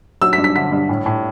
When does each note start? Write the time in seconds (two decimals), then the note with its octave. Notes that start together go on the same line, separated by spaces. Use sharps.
0.21 F#3 E6
0.33 B6
0.38 G2
0.44 B6
0.56 D3 B6
0.72 G2
0.89 A2
1.06 A2